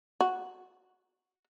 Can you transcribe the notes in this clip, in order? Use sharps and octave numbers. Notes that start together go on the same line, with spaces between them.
F#4